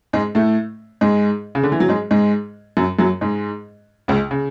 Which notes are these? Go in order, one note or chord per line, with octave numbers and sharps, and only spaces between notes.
G#2 G#3
A2 A3
G#2 G#3
C#3
D3
E3
F#3
G#2 G#3
G#2 G#3
F#2 F#3
F#2 F#3
G#2 G#3
C#2 C#3
C#3